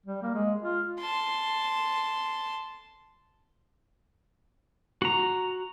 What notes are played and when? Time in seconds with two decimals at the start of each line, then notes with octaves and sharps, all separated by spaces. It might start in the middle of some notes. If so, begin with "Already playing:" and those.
0.06 G3
0.22 A#3
0.35 G#3
0.63 F4
0.99 A5 C6
5.02 F#4 A#5